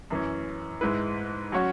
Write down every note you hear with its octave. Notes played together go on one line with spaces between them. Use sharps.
F#2 E3 C#4
G#2 G#3 E4 B4
F#3 C#4 F#4 C#5